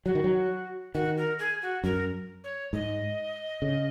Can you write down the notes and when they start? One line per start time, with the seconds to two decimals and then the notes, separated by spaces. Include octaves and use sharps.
0.05 F#3 F#4
0.15 D#3
0.24 F#3
0.94 D#3 F#4
1.17 A#4
1.39 G#4
1.62 F#4
1.84 F#2 A#4
2.44 C#5
2.73 G#2 D#5
3.62 C#3